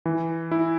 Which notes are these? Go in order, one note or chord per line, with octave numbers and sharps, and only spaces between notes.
E3
E4